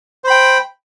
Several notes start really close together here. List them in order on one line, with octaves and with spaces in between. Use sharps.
C5 B5 G5